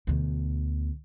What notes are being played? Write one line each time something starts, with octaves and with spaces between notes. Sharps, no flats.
D2 B2